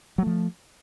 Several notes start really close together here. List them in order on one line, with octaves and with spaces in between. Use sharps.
F#3 A3 F3